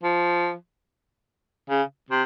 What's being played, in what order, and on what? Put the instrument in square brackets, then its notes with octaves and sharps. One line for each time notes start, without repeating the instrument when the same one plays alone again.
[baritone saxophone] F3
C#3
C3